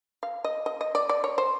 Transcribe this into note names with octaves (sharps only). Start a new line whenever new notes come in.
F5
D#5
D#5
D#5
D5
D5
C#5
C5